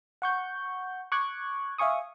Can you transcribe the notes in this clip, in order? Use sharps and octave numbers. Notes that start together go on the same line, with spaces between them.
F#5 C#6 G6
C#6 D6 F#6 G#6
E5 F5 G#5 C#6 D#6